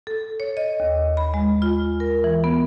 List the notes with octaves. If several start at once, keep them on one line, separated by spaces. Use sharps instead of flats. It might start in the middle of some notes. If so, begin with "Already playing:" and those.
A4
C#5
D#5
D#2
B5
G#3
F4
A#4
E3
B3